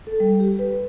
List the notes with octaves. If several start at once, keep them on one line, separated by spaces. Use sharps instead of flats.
A4
G3
G4
B4